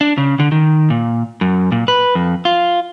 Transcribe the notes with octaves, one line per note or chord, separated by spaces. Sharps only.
D4
C#3
D3
D#3
A#2
F#2
A#2
B4
F2
F4